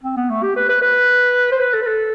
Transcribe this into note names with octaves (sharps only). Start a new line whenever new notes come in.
C4
B3
A3
G4
B4
B4
B4
C5
B4
A4
B4
A4